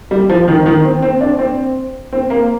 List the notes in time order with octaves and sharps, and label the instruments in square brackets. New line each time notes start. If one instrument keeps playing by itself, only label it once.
[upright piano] G3
F3
D#3
D#3
C4
C4
D4
C4
C4
A#3